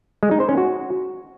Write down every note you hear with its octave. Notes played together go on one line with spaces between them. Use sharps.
G#3
D#4
C5
C#4
F#4